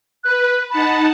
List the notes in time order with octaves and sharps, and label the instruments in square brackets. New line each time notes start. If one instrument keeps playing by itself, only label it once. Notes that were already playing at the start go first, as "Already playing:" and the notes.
[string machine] B4 [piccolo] F#6
[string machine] D#4 F#5 A5 [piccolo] B5